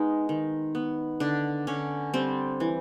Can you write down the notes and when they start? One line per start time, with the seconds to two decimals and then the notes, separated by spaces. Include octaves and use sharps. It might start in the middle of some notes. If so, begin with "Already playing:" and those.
Already playing: G#3 B3 D#4
0.29 D#3
0.75 B3
1.20 D3 D4
1.67 D3 C#4
2.14 G3 C4
2.60 E3